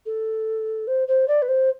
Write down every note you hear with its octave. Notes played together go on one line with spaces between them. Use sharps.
A4
C5
C5
D5
B4
C5